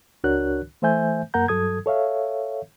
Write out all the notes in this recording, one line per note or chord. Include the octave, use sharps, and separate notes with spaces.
C#2 D4 F#4 A#4 C#5 F#6
E3 A3 C5 E5 G#5 G6
F#2 A#3 A#4 F#5 A#5 G6
G2 F#3 A4 D#6 G#6
A4 C#5 E5 F5